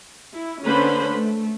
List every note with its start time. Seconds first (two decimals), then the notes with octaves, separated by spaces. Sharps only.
0.34 E4
0.65 D3 A#3 C#4 B4 C5 B5
1.13 A3